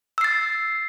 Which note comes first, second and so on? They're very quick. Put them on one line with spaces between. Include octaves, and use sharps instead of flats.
E6 C7 A6